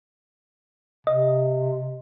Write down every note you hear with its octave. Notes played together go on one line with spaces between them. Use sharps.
C3 D#5